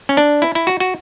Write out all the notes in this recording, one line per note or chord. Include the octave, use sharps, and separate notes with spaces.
C#4
D4
E4
E4
F#4
F#4